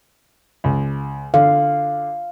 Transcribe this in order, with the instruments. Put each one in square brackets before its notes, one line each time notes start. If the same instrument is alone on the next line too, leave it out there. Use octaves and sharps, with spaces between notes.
[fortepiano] C#2
[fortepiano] D3 [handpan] F5